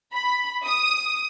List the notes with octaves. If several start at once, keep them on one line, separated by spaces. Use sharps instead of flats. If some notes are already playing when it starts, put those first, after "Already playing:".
B5
D#6